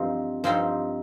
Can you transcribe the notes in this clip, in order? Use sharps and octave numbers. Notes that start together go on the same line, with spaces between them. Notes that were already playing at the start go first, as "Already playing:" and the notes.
Already playing: G2 F3 C4 D#4
G2 F3 C4 D#4